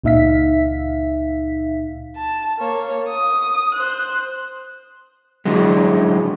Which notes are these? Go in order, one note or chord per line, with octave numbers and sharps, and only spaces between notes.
C#2 A#2 D#4 E5 F5 B6
A5
A#3 C#5
D#6
C5 F#6
D3 F#3 G#3